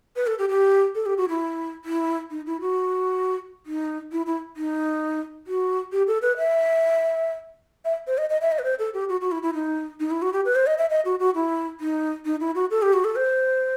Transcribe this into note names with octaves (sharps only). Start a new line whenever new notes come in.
B4
A4
G4
G4
A4
G4
F#4
E4
E4
D#4
E4
F#4
D#4
E4
E4
D#4
F#4
G4
A4
B4
E5
E5
C5
D#5
D#5
E5
D#5
B4
C5
A4
G4
F#4
F#4
E4
E4
D#4
D#4
E4
F#4
G4
B4
C5
D#5
E5
D#5
F#4
F#4
E4
D#4
D#4
E4
F#4
A4
G4
F#4
A4
C5